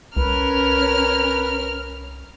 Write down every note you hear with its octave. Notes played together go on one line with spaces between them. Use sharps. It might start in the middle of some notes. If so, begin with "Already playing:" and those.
C2 C#4 A#4 B4 F6